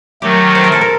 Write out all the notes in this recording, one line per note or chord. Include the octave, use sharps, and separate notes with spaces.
D#3 F#3 A3 G4
C5
A#4
A4
A#4